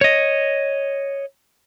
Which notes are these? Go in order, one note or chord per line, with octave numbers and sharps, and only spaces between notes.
C#5 D#5